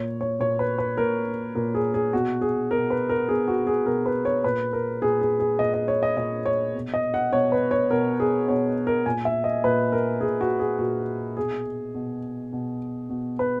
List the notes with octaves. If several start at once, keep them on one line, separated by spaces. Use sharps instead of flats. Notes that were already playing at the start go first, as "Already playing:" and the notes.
Already playing: A#2 C#5
C#5
A#2 C#5
B4
B4
A#2 A#4
A#2 A#4
G#4
G#4
B2 F#4
G#4
B2 A#4
B4
A#4
B2 G#4
F#4
G#4
B2 A#4
B4
C#5
A#2 B4
A#4
A#2 G#4
G#4
G#4
A#2 D#5
D#5
C#5
D#5
A#2 D#5
C#5
B2
D#5
F#5
B2 C#5
B4
C#5
B2 A#4
G#4
B2 C#5
A#4
A#2 G#5
E5
D#5
A#2 B4
A#4
A#2 G#4
F#4
G#4
A#2 F#4
B2 G#4
B2
B2
B2
B4